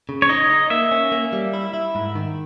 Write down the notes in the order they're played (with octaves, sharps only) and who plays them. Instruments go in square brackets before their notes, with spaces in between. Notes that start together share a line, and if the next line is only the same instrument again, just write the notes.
[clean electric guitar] C#3
[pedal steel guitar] C#5
[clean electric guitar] D#4 [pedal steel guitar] D#5
[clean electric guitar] D#4
[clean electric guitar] A#3 [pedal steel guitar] E5
[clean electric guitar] C#4
A#3
G3
E4
E4
G#2
D#3